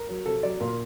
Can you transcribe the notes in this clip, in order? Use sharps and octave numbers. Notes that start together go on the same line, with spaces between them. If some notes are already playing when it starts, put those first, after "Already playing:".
Already playing: A#4
F#3
C3 A4
F#3 D5
A#2 A#4